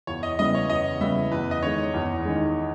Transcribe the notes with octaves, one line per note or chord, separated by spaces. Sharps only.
E2 C#5
D#5
C#3 G3 B3 E4 D#5
C#5
E2 D#5
C#3 G3 B3 E4 E5
E2 B4
D#5
D#3 G#3 C#5
E2
D#3 G#3